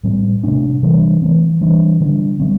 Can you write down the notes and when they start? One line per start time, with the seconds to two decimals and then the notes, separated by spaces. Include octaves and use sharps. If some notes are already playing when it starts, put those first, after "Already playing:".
0.04 A2 G3 C4
0.43 C3 A3 D4
0.82 C3 E3 G3 D4
1.22 E3 A3 C4
1.61 E3 G3 D4
2.00 D3 G3 D4
2.40 G3 C4